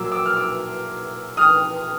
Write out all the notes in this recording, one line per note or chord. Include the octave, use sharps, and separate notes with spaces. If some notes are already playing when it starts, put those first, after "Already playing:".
Already playing: A#2 F#3 A#3 D6 E6
D6 E6
F6
D6 E6
D#6 F6